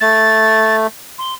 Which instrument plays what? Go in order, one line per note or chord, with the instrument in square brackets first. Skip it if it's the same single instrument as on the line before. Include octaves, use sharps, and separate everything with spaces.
[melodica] A3 [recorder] A6
[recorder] C6